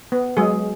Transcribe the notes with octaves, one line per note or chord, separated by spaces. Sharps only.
B3
F#3 G#3 G#4